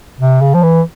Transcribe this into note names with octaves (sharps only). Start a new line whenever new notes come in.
C3
C#3
F3
E3